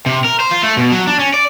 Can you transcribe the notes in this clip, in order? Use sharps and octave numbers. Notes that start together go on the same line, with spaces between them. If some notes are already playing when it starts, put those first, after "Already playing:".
C3
A#4
C5
F4
A3
B2
F#3
D4
C#4
D5